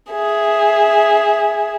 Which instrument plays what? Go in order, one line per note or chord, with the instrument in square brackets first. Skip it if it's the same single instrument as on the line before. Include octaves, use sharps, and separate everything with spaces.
[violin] G#4 E5